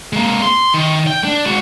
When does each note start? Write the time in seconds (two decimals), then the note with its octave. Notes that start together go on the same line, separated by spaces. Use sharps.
0.13 G#3 A#3
0.42 C6
0.74 D#3
1.07 G5
1.25 D4
1.46 G#3 F#4